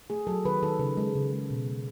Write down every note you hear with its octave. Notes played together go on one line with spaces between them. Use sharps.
A3 G#4
F#3 A4
D#3 B4
D#3 A4
C#3 B4
G#3
C#3
G#3
B2
G#3